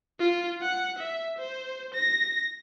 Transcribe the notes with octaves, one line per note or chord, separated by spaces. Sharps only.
F4
F#5
E5
C5
A#6